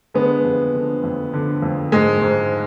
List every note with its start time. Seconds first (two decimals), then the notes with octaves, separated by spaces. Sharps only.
0.14 D3 G#3 B3
0.45 F2
0.74 D3
1.04 F2
1.33 D3
1.62 F2
1.92 G#2 G#3
2.22 G#2